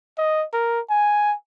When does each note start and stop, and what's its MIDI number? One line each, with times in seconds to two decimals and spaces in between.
0.18 0.45 75
0.53 0.80 70
0.90 1.34 80